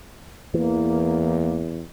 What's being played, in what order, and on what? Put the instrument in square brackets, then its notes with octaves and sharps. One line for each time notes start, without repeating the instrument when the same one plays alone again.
[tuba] E2 [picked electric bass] E3 [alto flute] A#3